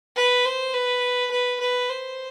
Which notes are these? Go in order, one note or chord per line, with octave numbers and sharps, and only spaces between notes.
B4
C5
B4
B4
B4
C5